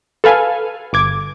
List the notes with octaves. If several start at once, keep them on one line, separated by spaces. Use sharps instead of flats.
A4 B4 F5 G#5
G1 D6 G#6